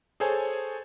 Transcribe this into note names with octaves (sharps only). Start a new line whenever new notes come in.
G#4 A4 C5 C#5 G#5 A5